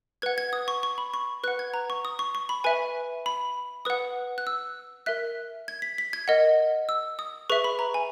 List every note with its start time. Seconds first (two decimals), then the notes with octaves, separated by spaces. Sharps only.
0.22 B4 F#5 G#6
0.38 G#6
0.53 D#6
0.68 C#6
0.83 C#6
0.98 B5
1.14 C#6
1.44 B4 F#6
1.48 F#5
1.59 G#6
1.74 A#5
1.90 C#6
2.05 D#6
2.19 C#6
2.35 C#6
2.49 B5
2.64 B4 E5 G#5
3.26 B5
3.85 B4 F#5 D#6
4.38 F#6
4.47 E6
5.06 A#4 E5 F#6
5.68 G#6
5.82 B6
5.98 B6
6.13 G#6
6.28 A#4 D#5 F#5
6.89 E6
7.19 D#6
7.50 G#4 B4 E5 C#6
7.64 B5
7.79 A#5
7.94 G#5